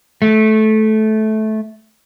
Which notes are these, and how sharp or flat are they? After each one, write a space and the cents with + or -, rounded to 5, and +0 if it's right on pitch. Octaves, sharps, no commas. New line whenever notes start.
A3 -15